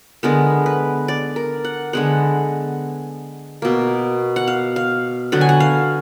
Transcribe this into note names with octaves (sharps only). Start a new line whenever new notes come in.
D3 G#3 B3 A#4
B4
D5
A#4
F#5
D3 G#3 B3 F#5
B2 A#3
F#5
F5
F5
D3 F#3 B3 F#5
G#5
F#5
F5